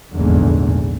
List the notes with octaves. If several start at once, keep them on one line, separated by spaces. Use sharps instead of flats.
F1 A#1 E2 G#2 D3 F#3